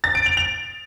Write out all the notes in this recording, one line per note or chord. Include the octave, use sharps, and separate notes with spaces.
A6
D7
F7
F7